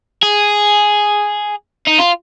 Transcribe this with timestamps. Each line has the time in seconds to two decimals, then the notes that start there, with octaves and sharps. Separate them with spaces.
0.23 G#4
1.88 D#4
1.99 F4